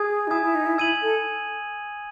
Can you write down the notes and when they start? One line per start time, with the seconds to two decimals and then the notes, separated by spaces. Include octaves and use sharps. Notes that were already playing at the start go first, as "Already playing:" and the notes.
Already playing: G#4 G#5 D#6 G#6
0.27 D#4
0.31 E4 G#5 D#6 G#6
0.42 E4
0.55 D#4
0.66 E4
0.78 E4 E6 G#6 D#7 F#7
1.02 A4